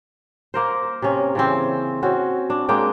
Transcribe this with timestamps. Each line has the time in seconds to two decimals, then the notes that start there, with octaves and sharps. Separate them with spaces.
0.54 A#3 A#4 C5
1.02 C3 C#4
1.35 C#3 E3 C4
2.03 C4 C#4 F#4
2.50 D4
2.69 G#3 A#3 D4 G5